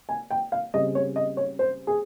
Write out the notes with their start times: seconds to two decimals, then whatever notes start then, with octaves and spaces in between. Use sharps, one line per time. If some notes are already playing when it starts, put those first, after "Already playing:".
0.09 G#5
0.31 G5
0.52 F5
0.74 C#3 G3 C4 D#5
0.95 C#5
1.16 D#5
1.37 C#5
1.59 C5
1.87 G#4